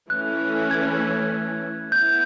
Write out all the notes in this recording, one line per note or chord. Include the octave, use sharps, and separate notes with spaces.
E3 A3 C#4 F#6
G#6
B3 E4 G6